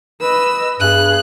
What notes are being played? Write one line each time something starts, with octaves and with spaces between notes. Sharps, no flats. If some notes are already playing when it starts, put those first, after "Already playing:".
B4 D#5 E6
G2 B3 G#4 F#6